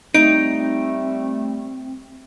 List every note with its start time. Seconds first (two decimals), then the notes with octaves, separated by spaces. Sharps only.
0.14 G3 A3 C4 D#4 D7